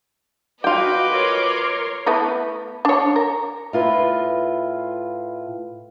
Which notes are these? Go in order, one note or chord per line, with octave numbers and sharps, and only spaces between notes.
F4 F#4 B4 D#5 G5 D6
A#4 C#5 C6
A3 B3 E4
D4 C#5
A#4
A2 F4 B4